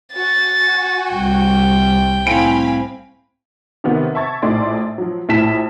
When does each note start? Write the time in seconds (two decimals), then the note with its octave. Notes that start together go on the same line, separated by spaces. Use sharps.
0.14 F#4 G#5 A6
1.13 C2 G3 G5
2.27 A2 C4 F5 G#5 B5 D7
3.84 C3 D#3 B3
4.15 E5 A5 C#6 G#6 A6
4.42 A#1 A2 A3 D#4 D5 C6
4.98 F3 F#3
5.29 A#1 A2 E4 A5 B6 E7